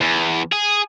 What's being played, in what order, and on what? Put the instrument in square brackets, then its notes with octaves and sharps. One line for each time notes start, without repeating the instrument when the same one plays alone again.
[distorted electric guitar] E2
G#4